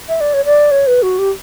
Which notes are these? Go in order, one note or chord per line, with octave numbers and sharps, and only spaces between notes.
E5
D5
C#5
D5
C#5
B4
F#4
G4